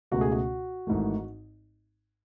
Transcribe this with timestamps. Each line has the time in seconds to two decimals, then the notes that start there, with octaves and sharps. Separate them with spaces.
0.11 C#2 B2 A3 F#4
0.21 G#4
0.32 F#4
0.87 G#1 G#2 E3 A3